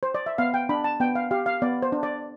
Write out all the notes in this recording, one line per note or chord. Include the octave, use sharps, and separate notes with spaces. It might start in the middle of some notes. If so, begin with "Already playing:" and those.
C5
D5
E5
B3 F5
G5
D4 B5
A5
B3 G5
F5
G4 F5
F5
B3 D5
C5
D4
D5